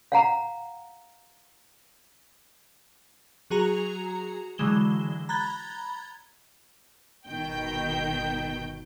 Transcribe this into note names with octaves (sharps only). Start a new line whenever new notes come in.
F5 F#5 A#5
F#3 F#4 G#4 A#5 C#7 F7
D3 E3 F#3 G#3 E7 G7
A#5 B5 F#6 G#6 A6 G7
G1 B2 D#3 G5 G6